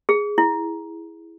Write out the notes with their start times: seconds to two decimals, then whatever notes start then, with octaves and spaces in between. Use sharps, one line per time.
0.09 G#4
0.38 E4